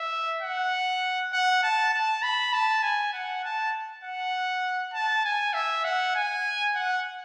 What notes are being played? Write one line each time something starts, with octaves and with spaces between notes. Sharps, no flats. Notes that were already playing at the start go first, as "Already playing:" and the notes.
Already playing: E5
F#5
F#5
A5
A5
B5
A5
G#5
F#5
A5
F#5
A5
G#5
E5
F#5
G#5
F#5